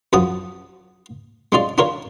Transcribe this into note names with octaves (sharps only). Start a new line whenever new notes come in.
F#2 F3 F#4 G#5 D#6
G#3 C#4 F4 D5
D4 F4 A#4 C#5